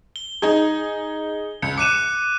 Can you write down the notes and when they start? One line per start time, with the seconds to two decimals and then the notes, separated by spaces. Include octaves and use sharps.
0.16 G7
0.42 D#4 G#4
1.62 C#2 C#7
1.78 D6 F#6 C#7 D#7 E7